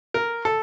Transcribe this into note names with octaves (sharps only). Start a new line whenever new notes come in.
A#4
A4